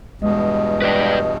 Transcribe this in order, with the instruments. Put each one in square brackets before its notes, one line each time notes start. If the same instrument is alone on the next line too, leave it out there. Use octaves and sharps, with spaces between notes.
[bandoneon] E2 G2 B2 [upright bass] G#3 [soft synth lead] D#5
[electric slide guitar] B4 D5 G5